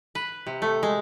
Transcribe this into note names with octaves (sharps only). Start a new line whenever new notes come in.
B4
C3
A3
G#3